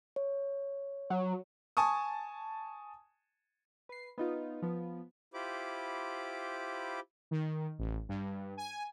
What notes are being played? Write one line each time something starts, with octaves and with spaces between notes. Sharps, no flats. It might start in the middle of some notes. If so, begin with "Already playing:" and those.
C#5
F#3
G#5 A5 C#6 D#6
B4 C7
B3 D#4 F4
F3 B3
E4 F4 G4 C5 B5 D6
D#3
A1
G2
G#5